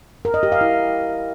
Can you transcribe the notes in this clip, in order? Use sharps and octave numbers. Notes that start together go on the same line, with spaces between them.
A#4
D#5
G4
F5
E4